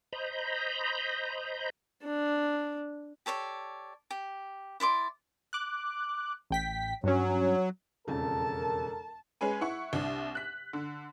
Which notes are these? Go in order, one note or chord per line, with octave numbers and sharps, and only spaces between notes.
C5 D#5 A#5 B5 G6
D4
G4 A4 C#5 D5
G4
E4 D5 C6 D6
D6 F#6
A1 G5 B6
G2 F#3 C#4
E1 F2 C#3 A4 A#4 A5
G#3 C#4 G#4 B4 G#5
E4 F#5 C#6
C2 D4
F#6 B6
D3